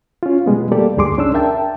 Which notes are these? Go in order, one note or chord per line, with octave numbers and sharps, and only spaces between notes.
C#4 F4
B2 G3 G#3 B3
G3 A3 A#3 G4 A4 D5
D2 G2 G#4 C6 D6
C#2 C#4 D4 E6
A#4 E5 G5 A5